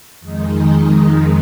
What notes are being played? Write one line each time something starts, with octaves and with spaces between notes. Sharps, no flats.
F2 D#3 G#3 D#4